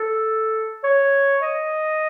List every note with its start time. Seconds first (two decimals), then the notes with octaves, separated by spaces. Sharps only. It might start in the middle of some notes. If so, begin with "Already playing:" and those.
Already playing: A4
0.84 C#5
1.42 D#5